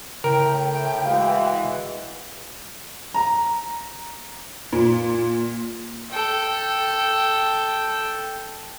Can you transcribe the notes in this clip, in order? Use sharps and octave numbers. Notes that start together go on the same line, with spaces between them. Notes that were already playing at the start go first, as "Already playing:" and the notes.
A2 C#3 A#4 G5
E3 G#3 F#4 F5
A#5
A#2
A4 G5